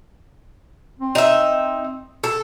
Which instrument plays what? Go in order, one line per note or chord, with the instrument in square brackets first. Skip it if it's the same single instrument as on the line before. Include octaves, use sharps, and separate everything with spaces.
[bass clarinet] C4
[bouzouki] D#4 E5
A4